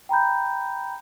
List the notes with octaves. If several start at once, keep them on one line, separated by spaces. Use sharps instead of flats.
G5 A#5 B5 G6